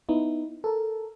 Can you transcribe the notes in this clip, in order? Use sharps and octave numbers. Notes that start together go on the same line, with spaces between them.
B3 D#4 E4
A4 A#4